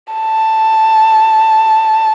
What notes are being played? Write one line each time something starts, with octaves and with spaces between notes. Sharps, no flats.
A5